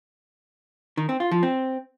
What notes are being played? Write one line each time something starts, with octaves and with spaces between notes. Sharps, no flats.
D#3
C4
F4
F3
C4